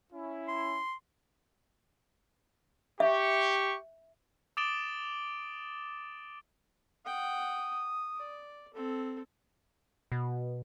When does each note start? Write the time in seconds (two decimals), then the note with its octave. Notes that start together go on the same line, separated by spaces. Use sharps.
0.13 C#4 E4
0.48 C6
3.00 G4 E5 C#6
4.57 D6 D#6 A6 D7 E7 G7
7.06 F#5 G5 D#6
8.16 D5
8.74 C4 A4
10.12 B2